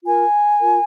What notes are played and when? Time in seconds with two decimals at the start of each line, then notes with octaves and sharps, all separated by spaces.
0.04 F4 A#4 G#5
0.59 F4 A#4